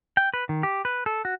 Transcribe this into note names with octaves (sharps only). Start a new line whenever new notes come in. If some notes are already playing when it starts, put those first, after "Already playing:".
G5
B4
D#3
G4
B4
A4
F#4